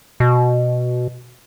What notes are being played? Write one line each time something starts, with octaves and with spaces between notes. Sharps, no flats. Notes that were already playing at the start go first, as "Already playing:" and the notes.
B2